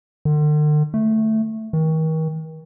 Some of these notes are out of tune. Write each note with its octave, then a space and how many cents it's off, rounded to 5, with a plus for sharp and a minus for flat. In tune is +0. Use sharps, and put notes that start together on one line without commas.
D3 +45
A3 +0
D#3 +40